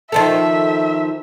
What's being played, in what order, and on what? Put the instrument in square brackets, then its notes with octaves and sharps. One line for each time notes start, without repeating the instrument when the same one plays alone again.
[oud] D#3 F3 A4 [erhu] E5